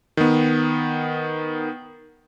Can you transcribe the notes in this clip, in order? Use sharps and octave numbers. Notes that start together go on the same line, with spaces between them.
D#3 B3